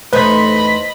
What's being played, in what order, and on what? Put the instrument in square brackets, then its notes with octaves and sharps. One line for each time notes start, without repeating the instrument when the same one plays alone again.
[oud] E2 A3 D#4 [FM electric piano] B4 C5 [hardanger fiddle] D#5 B5